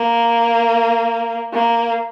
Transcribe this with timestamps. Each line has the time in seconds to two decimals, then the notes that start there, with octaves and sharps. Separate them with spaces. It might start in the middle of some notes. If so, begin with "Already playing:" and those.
Already playing: A#3
1.53 A#3